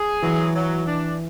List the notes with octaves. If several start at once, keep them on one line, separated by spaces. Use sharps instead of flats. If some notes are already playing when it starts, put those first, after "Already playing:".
Already playing: G#4
E3 F#3
F#3
D4